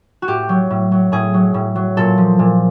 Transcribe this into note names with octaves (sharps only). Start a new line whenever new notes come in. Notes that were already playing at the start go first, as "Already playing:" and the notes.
F#4
A2 G4
F#3
A2
F#3
A2 G#4
F#3
A2
F#3
A#2 A4
F3
A#2